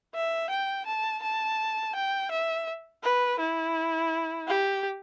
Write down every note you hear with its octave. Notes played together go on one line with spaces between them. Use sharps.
E5
G5
A5
A5
G5
E5
B4
E4
G4